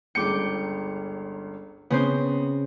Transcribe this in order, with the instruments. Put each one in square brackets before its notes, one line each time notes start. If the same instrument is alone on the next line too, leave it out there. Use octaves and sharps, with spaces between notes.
[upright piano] G1 C#2 C#7 [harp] G5 D6
[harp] C#3 C4 C5 [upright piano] B3